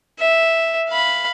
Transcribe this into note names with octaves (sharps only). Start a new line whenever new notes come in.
E5
F5 B5